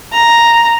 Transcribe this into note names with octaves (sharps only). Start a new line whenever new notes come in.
A#5